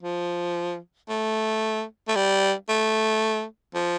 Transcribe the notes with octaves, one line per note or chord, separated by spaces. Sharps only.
F3
A3
A3
G3
A3
F3